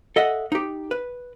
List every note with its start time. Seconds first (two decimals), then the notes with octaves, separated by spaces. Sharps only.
0.16 A4 D#5 E5 F#5
0.52 D#4 G4
0.91 B4